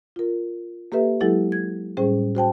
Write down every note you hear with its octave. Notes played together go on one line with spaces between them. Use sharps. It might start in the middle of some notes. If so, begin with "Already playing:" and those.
F4 A#4
A#3 G4 A4 B4 E5
F#3 G#3 E4 G4 A4
G#6
A2 G3 C#4 G#4 C5
F#4 C5 G5 A5